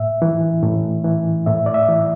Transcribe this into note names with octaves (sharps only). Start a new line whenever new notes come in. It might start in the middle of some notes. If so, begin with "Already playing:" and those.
Already playing: A2 E5
E3
A2
E3
A2 E5
D5
E5
E3